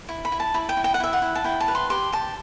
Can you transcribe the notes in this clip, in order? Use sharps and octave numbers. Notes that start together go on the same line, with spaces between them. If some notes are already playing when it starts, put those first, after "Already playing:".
E4
B5
E4
A5
E4 B5
G5
E4
G5
F#5
E4 E5
F#5
E4
A5
E4 G5
A5
B4
C6
G4 C6
G4 A5